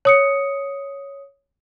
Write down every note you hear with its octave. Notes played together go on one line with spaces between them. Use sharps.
C#5 D#6 C#7